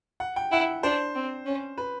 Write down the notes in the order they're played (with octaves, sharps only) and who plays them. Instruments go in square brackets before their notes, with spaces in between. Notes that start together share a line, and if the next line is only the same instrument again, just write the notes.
[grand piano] F#5
G5
[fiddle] E4 [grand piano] F#5
[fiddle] D4 [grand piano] C5
[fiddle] C4
C#4
[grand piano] B4